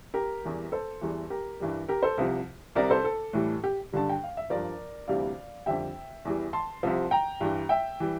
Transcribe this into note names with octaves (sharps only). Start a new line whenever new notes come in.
G4 A#4
E2 E3 G3
A4 C5
E2 E3 G3
G4 A#4
G2 E3 G3
G4 A#4
A4 C5
C2 C3 F3
C2 C3 G3 A#4 D5
A4 C5
A4
A2 E3 G3
G4
G2 D3 G3 A5
G5
F5
E5
G2 F3 A#4 D5
D2 C3 E3 G3 D5 F5
F2 D3 G3 E5 G5
E2 E3 G3
A5 C6
C2 C3 F3
G5 A#5
G2 E3 G3
E5 G5
E3 G3